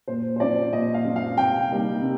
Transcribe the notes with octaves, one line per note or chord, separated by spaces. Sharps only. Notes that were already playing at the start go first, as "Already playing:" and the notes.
A#2 C5
C5
F3 C4 F4 D5
A#2 D#5
F5
F3 C4 F4
F5
C3 G5
G3 A#3 D#4
C3